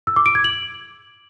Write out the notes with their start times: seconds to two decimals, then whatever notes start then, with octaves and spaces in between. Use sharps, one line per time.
0.07 E6
0.16 D6
0.26 D7
0.35 G#6
0.44 F#7